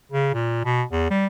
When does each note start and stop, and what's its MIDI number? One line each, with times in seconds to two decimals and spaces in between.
0.11 0.29 49
0.34 0.65 46
0.65 0.82 47
0.92 1.07 40
1.10 1.27 55